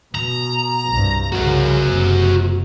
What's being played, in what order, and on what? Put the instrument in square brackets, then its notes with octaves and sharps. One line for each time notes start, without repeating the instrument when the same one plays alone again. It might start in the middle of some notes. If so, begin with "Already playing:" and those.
[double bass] B2 [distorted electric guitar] A#5
[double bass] C2 G2
[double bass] C2 C#3 [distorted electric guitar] F#4 A#4
[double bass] F#1 C3